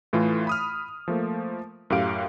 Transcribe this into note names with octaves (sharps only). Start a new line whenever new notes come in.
A2 E3 A3 F4
B5 D#6 F6
F3 A3 A#3
F#2 A2 G4 F5 D7